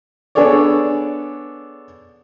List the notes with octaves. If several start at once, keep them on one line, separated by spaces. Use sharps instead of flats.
B3 D4 G#4 A4 C#5 D5